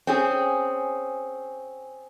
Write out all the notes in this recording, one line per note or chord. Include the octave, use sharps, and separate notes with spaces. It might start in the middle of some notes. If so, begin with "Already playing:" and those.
C4 C#4 G#4